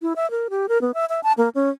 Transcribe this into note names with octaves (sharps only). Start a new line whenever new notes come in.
E4
E5
A#4
G4
A#4
B3
E5
E5
A5
A#3
C#4